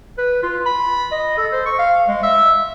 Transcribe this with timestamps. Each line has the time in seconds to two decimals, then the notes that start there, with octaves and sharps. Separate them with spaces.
0.18 B4
0.43 F4
0.66 B5
1.12 D#5
1.38 A4
1.52 C5
1.66 C#6
1.79 F5
2.08 G#3
2.23 E5